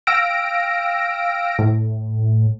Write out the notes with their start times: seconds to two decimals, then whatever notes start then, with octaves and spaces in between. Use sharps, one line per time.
0.07 F5 G5 E6 F6 A#6 D7
1.59 A2